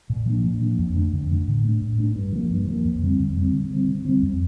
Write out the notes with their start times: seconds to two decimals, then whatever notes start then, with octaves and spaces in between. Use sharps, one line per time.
0.10 A#2
0.26 F3 A#3 D4
0.44 A#2
0.61 F3 A#3 D4
0.79 F2
0.96 D3 A3 D4
1.12 F2
1.30 D3 A3 D4
1.47 A2
1.64 A3 D4
1.81 A2
1.98 A3 D4
2.15 G2
2.33 F3 A#3
2.50 G2
2.67 F3 A#3
2.84 F2
3.02 D3 G3 C4
3.19 F2
3.36 D3 G3 C4
3.54 D3
3.71 G3 C4
3.88 D3
4.05 G3 C4
4.22 F2